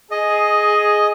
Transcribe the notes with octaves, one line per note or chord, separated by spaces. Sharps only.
G#4 D#5